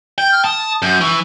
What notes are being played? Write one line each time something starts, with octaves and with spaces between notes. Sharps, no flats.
G5 G6
F6
A5 D#6
F#2 G6
E3 C#6